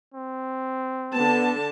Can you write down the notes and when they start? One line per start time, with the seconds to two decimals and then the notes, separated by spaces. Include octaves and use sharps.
0.14 C4
1.14 D3 B3 A5